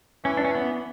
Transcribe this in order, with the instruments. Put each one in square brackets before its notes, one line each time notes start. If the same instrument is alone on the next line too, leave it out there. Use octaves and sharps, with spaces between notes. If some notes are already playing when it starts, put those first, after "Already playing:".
[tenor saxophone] E3 [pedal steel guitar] C#4
[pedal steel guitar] D4
C#4
B3